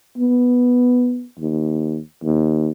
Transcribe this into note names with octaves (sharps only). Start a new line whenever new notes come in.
B3
D#2
D#2